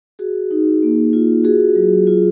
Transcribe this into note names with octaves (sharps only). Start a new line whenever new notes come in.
F#4 G#4
D#4
A#3
F4
F#4 G#4
F#3
F4